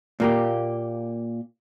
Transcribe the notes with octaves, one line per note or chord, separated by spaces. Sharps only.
A#2 A#3 G4